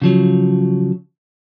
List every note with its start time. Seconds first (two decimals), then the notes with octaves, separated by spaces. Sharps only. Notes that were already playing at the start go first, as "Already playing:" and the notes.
0.02 C#3 F3 F#3